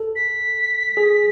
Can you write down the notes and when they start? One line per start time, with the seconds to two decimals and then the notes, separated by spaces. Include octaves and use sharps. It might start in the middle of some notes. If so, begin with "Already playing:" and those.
Already playing: A4
0.16 B6
0.97 G#4